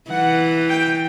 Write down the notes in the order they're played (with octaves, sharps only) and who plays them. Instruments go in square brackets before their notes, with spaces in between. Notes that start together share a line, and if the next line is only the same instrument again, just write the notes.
[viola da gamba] E3 [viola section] F#5
[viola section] G5